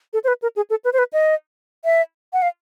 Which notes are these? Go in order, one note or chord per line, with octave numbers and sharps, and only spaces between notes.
A4
C5
B4
A#4
G#4
A4
B4
C5
B4
D#5
E5
F#5
F5